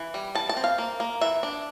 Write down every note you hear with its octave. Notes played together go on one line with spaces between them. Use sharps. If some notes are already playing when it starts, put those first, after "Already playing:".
Already playing: E3
G3
E3 A5
A5
C4
F5
A#3
A#3
E3 E5
D4